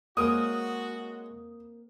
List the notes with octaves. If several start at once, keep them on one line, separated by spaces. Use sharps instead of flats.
G#3 A#3 C4 F#4 C#5 D#6